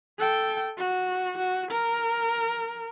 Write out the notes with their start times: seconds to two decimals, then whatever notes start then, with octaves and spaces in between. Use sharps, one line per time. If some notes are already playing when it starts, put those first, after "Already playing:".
0.19 A4 G5
0.77 F#4
1.38 F#4
1.71 A#4